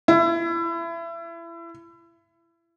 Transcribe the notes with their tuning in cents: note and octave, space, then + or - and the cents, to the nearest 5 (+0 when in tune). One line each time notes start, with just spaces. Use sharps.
E4 +30